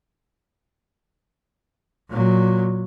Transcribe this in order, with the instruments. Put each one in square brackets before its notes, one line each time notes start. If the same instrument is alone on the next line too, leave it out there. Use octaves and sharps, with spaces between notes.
[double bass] A#2 F#3